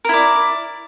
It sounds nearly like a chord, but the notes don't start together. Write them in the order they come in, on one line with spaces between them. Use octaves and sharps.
A#4 E4 D5